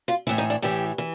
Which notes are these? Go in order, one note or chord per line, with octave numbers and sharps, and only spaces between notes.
F4
A2 E3 E4
D#4
D4
A2 E3 G4
E3